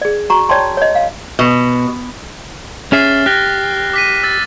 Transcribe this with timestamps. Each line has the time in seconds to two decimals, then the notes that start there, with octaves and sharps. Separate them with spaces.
0.02 G#4 D5
0.30 F#4 A#5 C#6
0.49 C#5 D5 G5 A5 C6
0.77 C#5 D#5
0.95 F5
1.39 B2
2.92 C#4 G#4 E5 F6 A6 C7
3.26 G4 F#6 A#6 G7
3.93 D6 B6 D#7
4.23 E6 A6